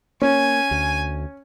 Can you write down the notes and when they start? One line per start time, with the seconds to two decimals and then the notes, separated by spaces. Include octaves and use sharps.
0.22 A#3 C#4 G#5
0.71 D2